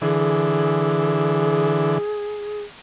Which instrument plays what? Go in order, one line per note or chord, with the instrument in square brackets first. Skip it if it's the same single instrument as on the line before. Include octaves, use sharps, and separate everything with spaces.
[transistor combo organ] D3 E3 [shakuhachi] G#4